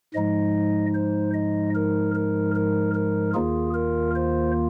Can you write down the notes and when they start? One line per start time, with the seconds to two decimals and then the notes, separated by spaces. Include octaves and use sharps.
0.14 G#2 F3 G#3 D#4 D#5
0.94 C5
1.34 D#5
1.75 A#4
2.15 A#4
2.55 A#4
2.94 A#4
3.34 D#2 D#3 A#3 F4 G#4
3.74 A#4
4.15 C5